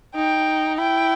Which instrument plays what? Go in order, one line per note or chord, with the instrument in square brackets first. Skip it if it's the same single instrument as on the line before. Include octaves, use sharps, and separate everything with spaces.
[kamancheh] D#4 [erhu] G5
[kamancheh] E4 [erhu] G5